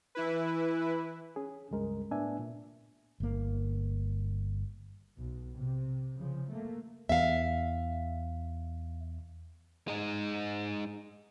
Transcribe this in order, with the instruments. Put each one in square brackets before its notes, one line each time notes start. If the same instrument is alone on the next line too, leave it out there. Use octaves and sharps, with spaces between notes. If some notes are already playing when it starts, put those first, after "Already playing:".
[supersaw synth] E3 E4 B4
[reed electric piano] C#4 G#4
C#2 G2 G#3 A#4
A2 B3 D4 E5 G#5
A#2
[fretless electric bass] G1 A#3
[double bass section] B1 B2
C3
C#3 F3
A3 A#3
[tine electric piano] E2 [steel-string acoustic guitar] E5 F5
[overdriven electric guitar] G#3 D#4